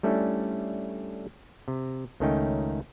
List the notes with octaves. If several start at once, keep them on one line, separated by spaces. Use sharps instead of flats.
G3 A3 C#4 D4 E4 A4
C3
C#2 D#3 A3 C#4 D#4 G5